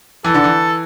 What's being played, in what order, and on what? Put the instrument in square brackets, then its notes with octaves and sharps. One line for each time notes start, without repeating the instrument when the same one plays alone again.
[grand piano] E3 [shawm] A4
[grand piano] D3
E3